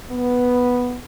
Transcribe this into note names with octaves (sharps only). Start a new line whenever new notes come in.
B3